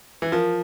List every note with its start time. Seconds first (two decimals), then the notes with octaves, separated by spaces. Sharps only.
0.22 E3
0.32 F3 A#4